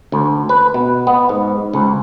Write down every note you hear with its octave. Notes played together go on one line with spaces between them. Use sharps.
D2
B4
B2
B3
G#2
C#2